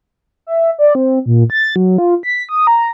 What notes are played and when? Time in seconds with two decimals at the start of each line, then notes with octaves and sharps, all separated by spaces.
0.47 E5
0.79 D5
0.95 C4
1.26 A#2
1.50 A6
1.76 F#3
1.98 F4
2.23 B6
2.49 D#6
2.67 A#5